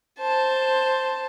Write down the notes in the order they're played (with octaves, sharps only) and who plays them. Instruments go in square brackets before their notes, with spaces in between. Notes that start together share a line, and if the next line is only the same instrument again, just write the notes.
[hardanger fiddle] C5 A5